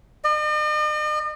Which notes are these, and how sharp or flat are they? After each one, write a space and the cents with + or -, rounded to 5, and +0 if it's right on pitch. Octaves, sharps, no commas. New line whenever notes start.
D#5 -45